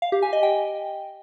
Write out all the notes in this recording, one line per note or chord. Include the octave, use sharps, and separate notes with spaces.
F5
G4
G#5
D#5
G5